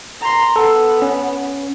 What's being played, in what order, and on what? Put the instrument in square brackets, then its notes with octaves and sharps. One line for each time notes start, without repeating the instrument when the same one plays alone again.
[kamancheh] A#5 C6
[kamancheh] B3 [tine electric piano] A4
[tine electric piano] C#4